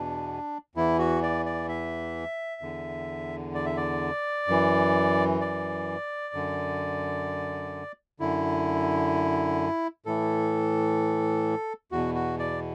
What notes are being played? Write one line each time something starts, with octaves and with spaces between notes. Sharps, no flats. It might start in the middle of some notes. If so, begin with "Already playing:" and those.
Already playing: E2 B2 D4
E2 E3 E4
F#4
D5
D5
E5
E2 D3
D5
E5
D5
F#2 E3
D5
F#2 D3
F#2 D3 E4
A2 E3 A4
E2 B2 F#4
F#4
D5